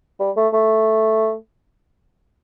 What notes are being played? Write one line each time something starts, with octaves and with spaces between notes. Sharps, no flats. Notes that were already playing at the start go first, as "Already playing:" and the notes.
G3
A3
A3